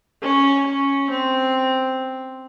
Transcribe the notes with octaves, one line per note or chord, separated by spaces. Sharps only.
C#4
C#4
C4